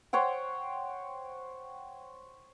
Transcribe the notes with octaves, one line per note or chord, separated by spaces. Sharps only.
C5 C#5 F#5 G5